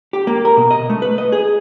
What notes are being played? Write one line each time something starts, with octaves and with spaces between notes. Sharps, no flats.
G4
A#3
A#4
B2
D#5
A3
B4
D#5
G#4